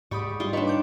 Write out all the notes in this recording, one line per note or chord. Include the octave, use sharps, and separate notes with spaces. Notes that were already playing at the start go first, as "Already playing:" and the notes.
G#2 G4 D5 B5 C#6 D#6
G3 F4 C6
D4 D#4 B4 C#5 G5 C#6
A#5 D6 G6